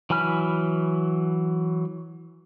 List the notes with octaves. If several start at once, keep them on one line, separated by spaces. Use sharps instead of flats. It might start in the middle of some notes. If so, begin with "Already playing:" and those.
E3 F#3 G#5 B5 F6